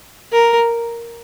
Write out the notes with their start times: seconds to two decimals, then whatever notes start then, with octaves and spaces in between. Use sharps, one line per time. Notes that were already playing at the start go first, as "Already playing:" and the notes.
0.32 A#4